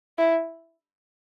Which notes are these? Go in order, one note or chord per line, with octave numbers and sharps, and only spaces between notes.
E4